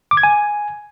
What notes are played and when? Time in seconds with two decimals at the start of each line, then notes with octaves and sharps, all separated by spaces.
0.11 D6
0.17 G#6
0.23 G#5